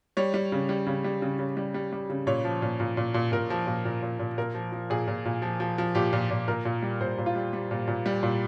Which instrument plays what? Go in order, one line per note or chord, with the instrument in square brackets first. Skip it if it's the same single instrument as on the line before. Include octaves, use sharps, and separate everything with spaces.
[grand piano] G3 C#5
G3
C#3
G3
C#3
G3
C#3
C#3
G3
G3
G3
C#3
A#2 C#5
F3
A#2
A#2
A#2
A#2
A#2 A#4
F3
A#2
A#2
A#2
A#2
A#2 A#4
F3
F3
A#2 G#4
A#2
A#2
F3
F3
F3
A#2 G4
A#2
A#2
A#2 A#4
A#2
G3
A#2 C5
A#2
F4
G3
G3
A#2
A#2
G3
A#2